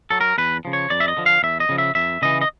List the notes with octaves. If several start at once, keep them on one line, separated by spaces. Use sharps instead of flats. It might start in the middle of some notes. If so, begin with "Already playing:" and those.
F#3 A4
A#4
E2 B4
C#3 F3
C#5
F2 D5
E5
D#5
D3 F3
F5
E2 E5
D#5
C#3 F3
E5
F2 E5
C#3 E3 D#5
D#5